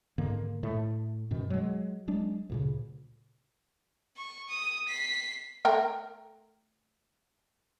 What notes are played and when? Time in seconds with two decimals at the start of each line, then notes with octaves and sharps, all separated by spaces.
0.18 G#2 D3 D#3 A#3
0.63 A2 A3
1.31 F#2 B2 D#3
1.50 F#3 G#3
2.08 F#3 G#3 D4
2.50 D2 A#2 C#3
4.17 C#6
4.49 D#6
4.88 B6 C7
5.65 A3 A#4 G5